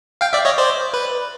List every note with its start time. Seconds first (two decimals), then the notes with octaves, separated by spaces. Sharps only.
0.21 F5 G5
0.33 D5 E5
0.45 C#5 D#5
0.58 C5 D5
0.94 B4